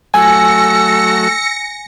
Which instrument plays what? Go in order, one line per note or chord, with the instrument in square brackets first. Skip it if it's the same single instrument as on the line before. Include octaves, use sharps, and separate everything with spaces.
[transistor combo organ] F#3 A3 [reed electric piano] G#5 [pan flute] E6 [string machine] A#6 C#7